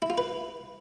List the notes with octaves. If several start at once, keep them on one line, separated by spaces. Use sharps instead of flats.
E4
F4
B4